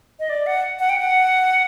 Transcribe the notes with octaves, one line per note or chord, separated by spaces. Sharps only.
D#5
D5
F#5
F#5
G5
F#5